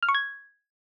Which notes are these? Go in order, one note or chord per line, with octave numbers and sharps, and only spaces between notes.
F6
C#6
G#6